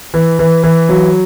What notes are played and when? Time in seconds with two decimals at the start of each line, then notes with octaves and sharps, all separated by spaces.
0.14 E3
0.39 E3
0.63 E3
0.89 F#3